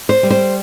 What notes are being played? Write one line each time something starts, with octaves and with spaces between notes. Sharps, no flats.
C5
G3
C5